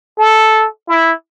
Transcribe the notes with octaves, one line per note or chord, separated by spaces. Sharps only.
A4
E4